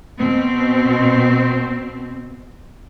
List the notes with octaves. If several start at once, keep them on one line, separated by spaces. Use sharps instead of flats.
B2 C4